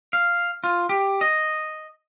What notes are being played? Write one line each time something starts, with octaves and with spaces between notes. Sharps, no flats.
F5
F4
G4
D#5